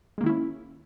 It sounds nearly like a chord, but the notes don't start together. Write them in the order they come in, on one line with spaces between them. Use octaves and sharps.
G#3 A#3 D#3 E4 C#4